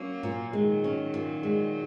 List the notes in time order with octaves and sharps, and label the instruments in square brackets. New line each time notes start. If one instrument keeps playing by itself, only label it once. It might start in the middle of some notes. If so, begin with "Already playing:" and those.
Already playing: [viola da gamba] F#3 A#3 [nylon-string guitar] C#4
[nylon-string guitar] A#2
[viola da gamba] D#3 F#3 [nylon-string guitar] G#3
[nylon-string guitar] C#4
A#2
G#3